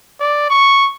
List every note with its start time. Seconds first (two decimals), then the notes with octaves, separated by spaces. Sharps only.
0.20 D5
0.50 C#6